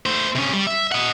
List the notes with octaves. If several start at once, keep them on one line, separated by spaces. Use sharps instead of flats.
A3 C5
C3 C#4
G3
E5
D#5 F#5